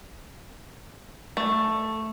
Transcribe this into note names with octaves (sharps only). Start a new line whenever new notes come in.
A3